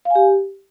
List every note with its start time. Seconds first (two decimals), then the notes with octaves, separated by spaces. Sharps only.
0.05 F5
0.10 G#5
0.15 G4